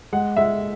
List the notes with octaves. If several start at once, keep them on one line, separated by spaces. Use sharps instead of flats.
G#3 F#5
G#3 E5